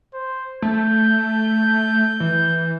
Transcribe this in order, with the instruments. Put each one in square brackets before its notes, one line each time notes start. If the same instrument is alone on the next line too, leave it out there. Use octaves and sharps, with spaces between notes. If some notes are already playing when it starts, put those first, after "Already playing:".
[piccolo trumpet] C5
[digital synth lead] A3 [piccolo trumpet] G6
[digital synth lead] E3